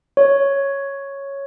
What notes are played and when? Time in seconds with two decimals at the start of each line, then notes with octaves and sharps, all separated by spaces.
0.17 C#5